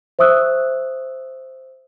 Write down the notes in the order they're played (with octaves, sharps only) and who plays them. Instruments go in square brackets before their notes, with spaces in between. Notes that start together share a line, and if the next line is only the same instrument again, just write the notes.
[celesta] C5 E5 C#6 D#6 E6 F#6